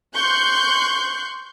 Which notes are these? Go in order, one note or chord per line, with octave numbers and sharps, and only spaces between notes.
C6 C#6 F#6 G6